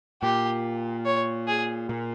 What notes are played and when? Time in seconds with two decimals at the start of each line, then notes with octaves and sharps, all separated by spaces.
0.22 A#2 G4
1.06 C#5
1.48 G#4
1.89 A#2